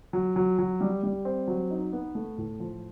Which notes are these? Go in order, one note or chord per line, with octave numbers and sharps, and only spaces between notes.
F#3
F#3
F#3
G3
G3
C4
F#3
D#4
B3
A3
A2
F3